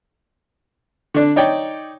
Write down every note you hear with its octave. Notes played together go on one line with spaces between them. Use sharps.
D3 D4
D#4 C#5 D5 G5